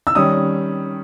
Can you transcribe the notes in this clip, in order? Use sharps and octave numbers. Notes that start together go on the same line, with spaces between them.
E6
D#3 G3 C#4 D#6